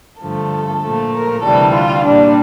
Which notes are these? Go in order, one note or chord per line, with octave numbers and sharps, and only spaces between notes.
G2 D3 F3 A3 A4
A#2 F3 A3
A#4
D2 C3 E3 G3 A4
F4
A#2 G3 D4